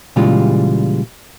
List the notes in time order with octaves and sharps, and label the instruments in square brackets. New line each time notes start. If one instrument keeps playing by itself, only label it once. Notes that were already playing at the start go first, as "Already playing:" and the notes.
[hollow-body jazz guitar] A#2 C#3 E3 G3 G#3 F4